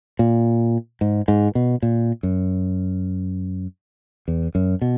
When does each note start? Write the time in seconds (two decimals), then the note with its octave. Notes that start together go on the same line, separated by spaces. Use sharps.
0.19 A#2
1.01 G#2
1.28 G#2
1.55 B2
1.82 A#2
2.23 F#2
4.28 E2
4.55 F#2
4.81 B2